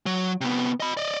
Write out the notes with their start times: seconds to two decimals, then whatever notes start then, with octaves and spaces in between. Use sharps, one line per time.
0.06 F#3
0.41 C3 B3
0.80 D#5 B5
0.97 D5 D#5